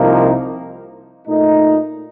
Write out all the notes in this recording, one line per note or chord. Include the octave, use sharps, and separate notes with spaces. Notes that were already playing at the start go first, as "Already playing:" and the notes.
Already playing: C2 C3 F3 A#3 D#4
A#2 A3 D#4